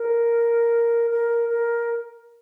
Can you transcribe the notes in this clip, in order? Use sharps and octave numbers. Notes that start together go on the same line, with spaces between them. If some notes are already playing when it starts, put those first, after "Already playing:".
Already playing: A#4
A#4
A#4